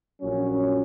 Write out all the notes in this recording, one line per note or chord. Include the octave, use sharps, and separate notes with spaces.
A#1 A#2 F#3 C#4